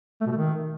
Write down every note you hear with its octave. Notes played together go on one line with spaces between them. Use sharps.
A3
B2
A3
D#3